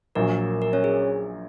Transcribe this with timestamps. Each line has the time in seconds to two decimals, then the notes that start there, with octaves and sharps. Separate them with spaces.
0.15 A#1 A#2 F#3 A#3 A#4
0.62 A#4
0.73 C#4 C#5
0.84 G#4